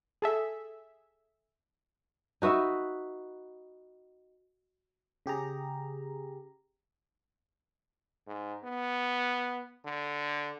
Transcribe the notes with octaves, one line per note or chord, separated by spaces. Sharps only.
G#4 A4 E5
D#4 F#4 B4 E5
C#3 G4 G#4 A#5
G#2
B3
D3